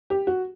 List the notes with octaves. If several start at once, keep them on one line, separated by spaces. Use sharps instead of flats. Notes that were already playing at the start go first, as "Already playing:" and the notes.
G4
F#4